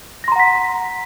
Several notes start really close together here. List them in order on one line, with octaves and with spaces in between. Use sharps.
A#6 C6 A#5 F#5 B6